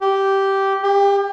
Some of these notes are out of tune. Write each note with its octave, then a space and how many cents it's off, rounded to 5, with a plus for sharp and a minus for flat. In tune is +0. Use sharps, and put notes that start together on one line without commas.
G4 -10
G4 +30